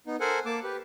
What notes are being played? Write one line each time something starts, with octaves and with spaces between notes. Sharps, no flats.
B3 D#4
A4 A#4 C5 F#5 G#5
A#3 A5 D6
G4 B4